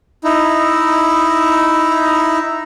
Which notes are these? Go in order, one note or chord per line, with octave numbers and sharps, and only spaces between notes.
D#4 E4